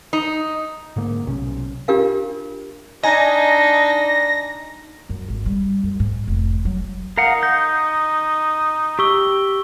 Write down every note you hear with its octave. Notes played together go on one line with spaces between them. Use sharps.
D#4
G#2 D3 A#3
B1 C3 D#3 C#4
D4 F4 G4 A#4 F5
D4 D#4 D#5 G#5 A#5 A#6
F#2
G#1
G3
F#2
G#2
F1
F#3
D#4 A#4 F5 F#5
G6 A#6
G4 C#6 E6 G7